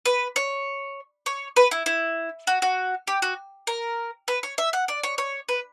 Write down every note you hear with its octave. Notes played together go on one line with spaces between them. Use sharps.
B4
C#5
C#5
B4
E4
E4
F#4
F#4
G4
F#4
A#4
B4
C#5
E5
F#5
D5
C#5
C#5
B4